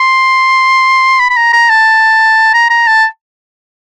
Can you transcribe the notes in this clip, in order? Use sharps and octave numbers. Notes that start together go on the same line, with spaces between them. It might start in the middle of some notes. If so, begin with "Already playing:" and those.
Already playing: C6
B5
B5
A#5
A#5
A5
A#5
A#5
A5